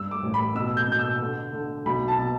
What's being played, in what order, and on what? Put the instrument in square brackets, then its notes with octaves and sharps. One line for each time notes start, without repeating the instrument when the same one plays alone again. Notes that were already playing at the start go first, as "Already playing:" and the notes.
Already playing: [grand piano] G2 E6
D6
A1
B5
B2 E6
G6
B2 G6
E6
D3
D3
B1 B5
A5
B2